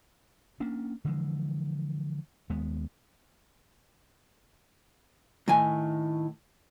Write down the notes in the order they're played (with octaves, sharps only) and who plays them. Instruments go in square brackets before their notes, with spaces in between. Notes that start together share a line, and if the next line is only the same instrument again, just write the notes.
[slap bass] A#3 C#4 D4
D3 E3 F3 G#3
D#2 G#3 B3
[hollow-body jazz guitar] A2 D#3 G#5